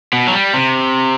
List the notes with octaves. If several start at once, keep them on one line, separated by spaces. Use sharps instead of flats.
B2
F#3
G3
C3